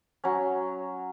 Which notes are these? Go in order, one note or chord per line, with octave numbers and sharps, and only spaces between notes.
F#3 C#4